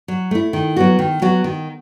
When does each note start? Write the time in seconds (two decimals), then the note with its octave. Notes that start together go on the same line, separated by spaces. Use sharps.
0.08 F#3
0.31 A3 E4
0.53 D#3
0.76 F#3 B3 F#4
0.99 D#3
1.22 F#3 B3 F#4
1.44 D#3